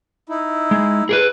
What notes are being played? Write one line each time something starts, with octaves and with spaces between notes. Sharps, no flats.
D#4 E4
G#3
G#4 A#4 B4